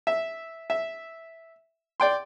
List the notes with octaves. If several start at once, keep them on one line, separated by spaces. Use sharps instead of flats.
E5
E5
D5 G5 C6